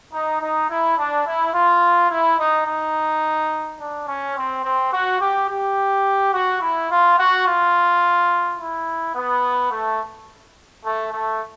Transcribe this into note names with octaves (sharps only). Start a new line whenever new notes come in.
D#4
D#4
E4
D4
E4
F4
E4
D#4
D#4
D4
C#4
C4
C4
F#4
G4
G4
F#4
E4
F4
F#4
F4
E4
B3
A3
A3
A3